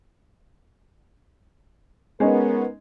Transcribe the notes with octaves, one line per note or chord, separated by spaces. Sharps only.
G#3 B3 C#4 D#4 A#4